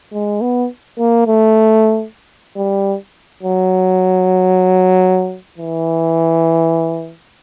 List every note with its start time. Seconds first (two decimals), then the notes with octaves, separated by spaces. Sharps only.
0.13 G#3
0.41 B3
0.99 A#3
1.27 A3
2.57 G3
3.43 F#3
5.58 E3